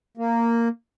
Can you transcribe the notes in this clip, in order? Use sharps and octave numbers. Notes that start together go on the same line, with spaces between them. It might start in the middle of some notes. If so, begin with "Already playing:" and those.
A#3